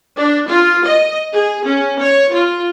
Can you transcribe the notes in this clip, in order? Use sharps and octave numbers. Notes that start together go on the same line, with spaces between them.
D4
F4
D#5
G#4
C#4
C#5
F4